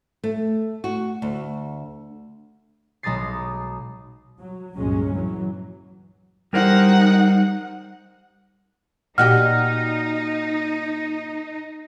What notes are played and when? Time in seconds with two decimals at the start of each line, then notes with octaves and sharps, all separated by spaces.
0.24 A3
0.84 F#4
1.22 D2
3.03 B1 G#3 A#5 D#6 A6 C7
4.38 F#3
4.76 C#2 G2 A#2 F#3 G#3 C#4
5.11 E3 F#3
6.53 G3 D#4 A#4 C5 F#5
9.18 A#2 D#4 F#4 G4 D#5 F#5 F6